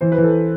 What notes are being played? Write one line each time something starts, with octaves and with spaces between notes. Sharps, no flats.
E3 C5
B4
E3
A4